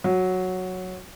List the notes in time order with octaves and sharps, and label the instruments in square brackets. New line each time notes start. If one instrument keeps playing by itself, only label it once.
[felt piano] F#3